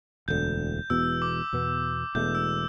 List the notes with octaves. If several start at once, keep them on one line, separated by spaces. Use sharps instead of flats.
E1 D2 D3 G6
E1 E2 B2 E6
D6
E2 B2 B3
E1 E2 B2 A3 G6
E6